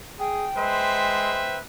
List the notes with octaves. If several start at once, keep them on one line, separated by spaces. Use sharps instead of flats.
G#4 G5
G#3 B4 C5 E5